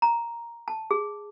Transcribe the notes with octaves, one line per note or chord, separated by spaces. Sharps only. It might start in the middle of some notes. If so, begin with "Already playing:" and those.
A#5
A5
G#4